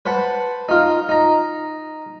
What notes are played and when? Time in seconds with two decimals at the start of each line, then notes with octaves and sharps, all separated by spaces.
0.06 B4 C5 F#5 A5
0.69 D#4 F4
1.09 D#4 A#5